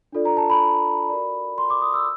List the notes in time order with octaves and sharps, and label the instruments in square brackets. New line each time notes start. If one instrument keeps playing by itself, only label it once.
[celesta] D4 F4 A4 D5
A#5
A5
B5
F#4 A#4 D5
C6
D6
D#6
E6